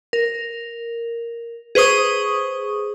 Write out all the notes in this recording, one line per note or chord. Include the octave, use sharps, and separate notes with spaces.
A#4
G#4 B4 C5 C#6 D#6